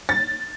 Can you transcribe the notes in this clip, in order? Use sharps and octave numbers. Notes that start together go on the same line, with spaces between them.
A6